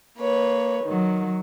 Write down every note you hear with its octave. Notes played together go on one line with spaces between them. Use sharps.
A#3 B4 C#5
D#3 F#3